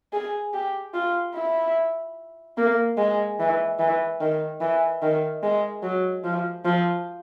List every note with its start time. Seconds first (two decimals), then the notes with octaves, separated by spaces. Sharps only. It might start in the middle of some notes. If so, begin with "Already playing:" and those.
0.13 G#4
0.54 G4
0.94 F4
1.35 E4
2.57 A#3
2.97 G#3
3.39 E3
3.79 E3
4.20 D#3
4.61 E3
5.02 D#3
5.43 G#3
5.83 F#3
6.24 F3
6.65 F3